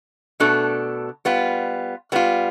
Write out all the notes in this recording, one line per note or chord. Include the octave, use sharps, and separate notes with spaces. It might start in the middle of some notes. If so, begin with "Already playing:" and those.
B2 A3 D4 A4
G3 B3 F4
G3 B3 F4